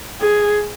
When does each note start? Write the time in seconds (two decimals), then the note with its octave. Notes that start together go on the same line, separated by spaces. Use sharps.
0.21 G#4